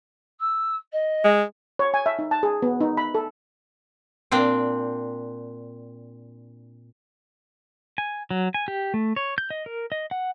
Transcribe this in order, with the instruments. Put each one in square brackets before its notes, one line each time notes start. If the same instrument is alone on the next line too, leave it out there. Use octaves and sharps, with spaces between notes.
[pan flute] E6
D#5
[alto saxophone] G#3
[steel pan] C#5
G#5
E5
D#4
A5
G#4
B3
D#4
B5
A4
[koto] A#2 C4 D4 G5
[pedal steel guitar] G#5
F#3
G#5
G4
A3
C#5
G6
D#5
A#4
D#5
F#5